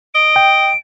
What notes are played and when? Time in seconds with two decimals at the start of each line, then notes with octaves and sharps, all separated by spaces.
0.15 D#5 D7
0.36 G5